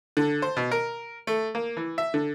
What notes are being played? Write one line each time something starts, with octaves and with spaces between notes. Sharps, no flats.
D3
C5
B2
A#4
A3
A#3
E3
E5
D3